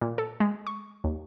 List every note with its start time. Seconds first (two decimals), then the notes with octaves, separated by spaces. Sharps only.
0.01 A#2
0.18 A4
0.40 G#3
0.67 C#6
1.04 D#2